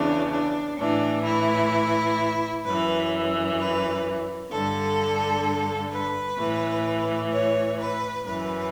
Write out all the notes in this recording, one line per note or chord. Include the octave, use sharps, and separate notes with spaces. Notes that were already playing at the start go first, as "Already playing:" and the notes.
Already playing: E2 C#3 E3 D4
D4
A2 E3 D4
E4
F#2 E3 B4
B4
G2 D3 A4
B4
A2 E3
C#5
B4
F#2 E3 B4